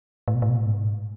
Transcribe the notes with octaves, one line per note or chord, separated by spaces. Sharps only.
A2
B2
A2
B2
A2
G#2